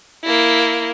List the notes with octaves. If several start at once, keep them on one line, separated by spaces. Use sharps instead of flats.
A#3 E4